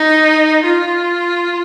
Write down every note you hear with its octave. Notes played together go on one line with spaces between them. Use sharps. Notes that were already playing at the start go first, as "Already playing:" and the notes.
Already playing: D#4
F4